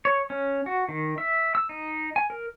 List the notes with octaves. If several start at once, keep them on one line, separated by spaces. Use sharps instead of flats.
C#5
C#4
F#4
D#3
E5
E6
D#4
G#5
A#4